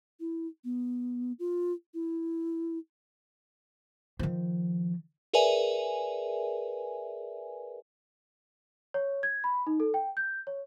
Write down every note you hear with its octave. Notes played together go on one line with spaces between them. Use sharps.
E4
B3
F4
E4
D#3 F3
G#4 A#4 B4 D5 E5 G#5
C#5
G#6
B5
D#4
A4
G5
G6
C#5